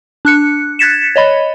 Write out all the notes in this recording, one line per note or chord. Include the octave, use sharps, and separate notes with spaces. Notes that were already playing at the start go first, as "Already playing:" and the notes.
D4 F#6 C#7
F#6 G#6 A6 B6 C#7 E7
C#5 D#5 B5